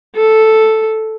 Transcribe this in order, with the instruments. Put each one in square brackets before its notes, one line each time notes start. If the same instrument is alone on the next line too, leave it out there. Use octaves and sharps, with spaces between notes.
[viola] A4